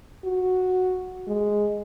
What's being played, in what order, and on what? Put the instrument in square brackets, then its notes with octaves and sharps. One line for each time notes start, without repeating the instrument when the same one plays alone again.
[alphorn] F#4
G#3